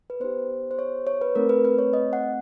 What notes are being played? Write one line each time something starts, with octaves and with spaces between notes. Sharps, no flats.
B4
B3 D#4 G4 C5
C5
C#5
C#5
B4
A3 C4 D#4 A#4
B4
B4
C#5
D#5
F#5